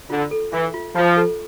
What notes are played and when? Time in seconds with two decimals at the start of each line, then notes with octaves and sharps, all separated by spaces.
0.10 D3 F4
0.31 A4
0.53 E3 E5
0.74 F4
0.95 F3 F4
1.17 A4